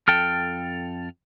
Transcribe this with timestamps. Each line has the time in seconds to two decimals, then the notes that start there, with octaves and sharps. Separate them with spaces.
0.08 F2 A4 G5 F6